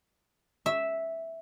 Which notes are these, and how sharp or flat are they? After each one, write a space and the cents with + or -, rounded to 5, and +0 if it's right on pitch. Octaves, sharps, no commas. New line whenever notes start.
E5 -5